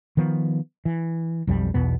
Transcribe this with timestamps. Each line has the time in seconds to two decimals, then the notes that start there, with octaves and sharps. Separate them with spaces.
0.17 D#3 F3 B3
0.85 E3
1.47 B1 F2 F3 G3
1.74 B1 E2 B2 B3